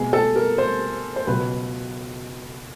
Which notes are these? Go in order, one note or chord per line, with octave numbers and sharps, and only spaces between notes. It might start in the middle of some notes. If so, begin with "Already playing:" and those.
Already playing: B2 G#3 B3 G#4
A4
A#4
C5
C5
C#2 B2 F#3 B4